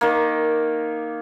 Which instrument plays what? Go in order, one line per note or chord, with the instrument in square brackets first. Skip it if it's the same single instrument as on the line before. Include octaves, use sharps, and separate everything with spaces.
[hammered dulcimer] D#3 A#3